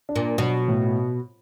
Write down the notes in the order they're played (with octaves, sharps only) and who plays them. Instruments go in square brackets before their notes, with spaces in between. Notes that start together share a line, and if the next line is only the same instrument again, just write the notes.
[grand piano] D4
[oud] A#2
[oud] B2 [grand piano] F#3
[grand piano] A2